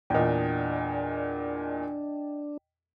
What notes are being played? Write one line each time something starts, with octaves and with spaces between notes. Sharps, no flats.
E2 A#2 D4 D#5 G5